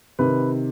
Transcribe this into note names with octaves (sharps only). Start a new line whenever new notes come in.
C3 D#3 B4